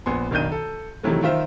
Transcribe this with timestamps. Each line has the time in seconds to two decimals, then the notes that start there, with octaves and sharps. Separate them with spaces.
0.06 A#1 B3 G#5 C6
0.31 F#1 B1 D#3 D4 G6 D#7
0.52 A4
1.03 C3 D#3 E3 F#3 A3
1.23 D#3 F4 C5 E5